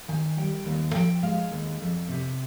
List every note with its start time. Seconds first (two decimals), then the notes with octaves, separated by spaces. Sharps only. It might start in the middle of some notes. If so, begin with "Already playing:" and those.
0.08 D#3 G#5
0.37 G3 G5
0.66 D#2
0.94 F3 G5
1.23 G#3 F5
1.51 D#2
1.80 F2
2.09 C3